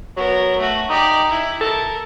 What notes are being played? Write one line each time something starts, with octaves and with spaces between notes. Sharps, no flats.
F#3 B3 A#4
A3 F#4
D#4 G4 D5
E4
A4 A#4